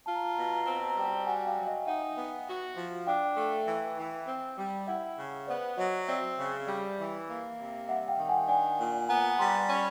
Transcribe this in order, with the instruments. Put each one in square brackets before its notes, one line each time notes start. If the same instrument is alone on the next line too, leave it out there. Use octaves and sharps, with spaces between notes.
[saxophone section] F4 [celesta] A5
[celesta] A#5
A5
[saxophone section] B2 [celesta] A#5
[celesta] A5
A#5
[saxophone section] C4 [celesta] A5
[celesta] A#5
A5
A#5
[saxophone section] G3 [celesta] G5 A5
[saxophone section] F#4 [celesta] F#5 G#5
[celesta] F5 G5
[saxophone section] F#3
[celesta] D#5 F5
[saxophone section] D#4 [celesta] E5 F#5
[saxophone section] B3
F#4
F3
[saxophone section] D4 [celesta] F5 G5
[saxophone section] A3
E3
E3
C4
G3
[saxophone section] E4 [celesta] E5 F#5
[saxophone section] C#3
[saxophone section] B3 [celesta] C5 D5
[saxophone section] F#3 [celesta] C#5 D#5
[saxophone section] C4 [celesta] D5 E5
[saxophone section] C#3
G3
E3
A#3
C3
[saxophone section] G3 [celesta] E5 F#5
[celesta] F5 G5
[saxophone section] D#3
[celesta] F#5 G#5
[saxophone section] D4 [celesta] F#5 G#5
[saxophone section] A#2
[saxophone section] B3 [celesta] G#5 A#5
[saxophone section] G3 [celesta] A#5 C6
[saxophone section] C#4 [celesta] B5 C#6